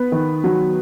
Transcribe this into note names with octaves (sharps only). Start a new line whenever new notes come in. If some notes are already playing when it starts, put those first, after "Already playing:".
Already playing: B3 B4
D#3
F#3